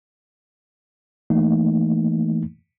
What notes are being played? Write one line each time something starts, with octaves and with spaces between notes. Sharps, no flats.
E3 A3 A#3 D#4